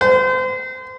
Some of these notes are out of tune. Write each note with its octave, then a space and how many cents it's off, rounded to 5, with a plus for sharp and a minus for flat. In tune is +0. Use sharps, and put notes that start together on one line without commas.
C5 -35